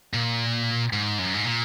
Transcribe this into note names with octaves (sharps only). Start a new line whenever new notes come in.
A#2
G#2
F#2
G#2
A#2